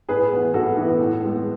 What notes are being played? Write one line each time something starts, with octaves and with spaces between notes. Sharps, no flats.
A2 G#4 B4
E3 B3
A2 F#4 A4
E3 B3
A2
G#3 B3